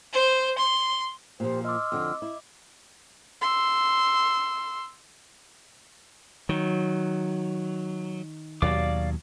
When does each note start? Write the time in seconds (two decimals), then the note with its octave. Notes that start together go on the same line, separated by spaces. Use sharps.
0.13 C5
0.58 C6
1.40 A#2 F3 G4 C5
1.65 D#5 C6 D6 E6 F6
1.92 F2 D3
2.22 E4
3.42 C6 E6
6.49 D#3 F#3
8.62 D#2 B2 F#3 D5 F5 D6